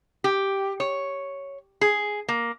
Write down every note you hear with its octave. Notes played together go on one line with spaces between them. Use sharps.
G4
C#5
G#4
A#3